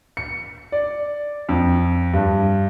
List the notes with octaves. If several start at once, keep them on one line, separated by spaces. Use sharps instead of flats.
C#7
D5
F2
G2